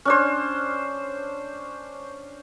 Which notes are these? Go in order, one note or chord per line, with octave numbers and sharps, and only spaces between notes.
C#4 D4 C5